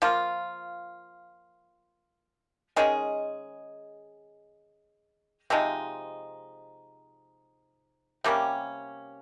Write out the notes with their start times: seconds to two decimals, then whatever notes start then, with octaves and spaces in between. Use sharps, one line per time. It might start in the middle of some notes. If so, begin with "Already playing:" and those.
0.02 F3 A#3 F4
2.76 D#3 G#3 C#4 G#4
5.50 C3 F3 G#3 D#4
8.24 C3 G3 A#3 C#4